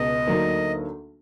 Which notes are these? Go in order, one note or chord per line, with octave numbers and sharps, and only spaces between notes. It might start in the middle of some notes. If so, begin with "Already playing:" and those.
Already playing: C#2 B2 D#5
D2 D3 F#3 A#3 D#4